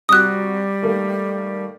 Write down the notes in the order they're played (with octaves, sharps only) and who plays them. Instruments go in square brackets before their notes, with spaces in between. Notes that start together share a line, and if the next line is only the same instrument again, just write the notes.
[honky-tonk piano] C3 F#4 [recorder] G3 [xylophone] D#6 F#6
[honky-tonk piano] D#3 A3 A#3